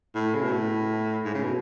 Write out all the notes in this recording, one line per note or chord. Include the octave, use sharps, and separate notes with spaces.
A2
C#3
B2
A2
G#2
C#3
B2